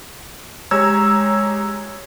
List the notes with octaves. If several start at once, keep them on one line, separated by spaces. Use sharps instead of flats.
G#3 G4 C#5 A#5 E6 G#6